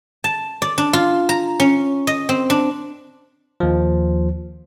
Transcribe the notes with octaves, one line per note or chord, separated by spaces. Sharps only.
A5
D5
D4
F4
A#5
C#4
D#5
C4
D4
D#2 F3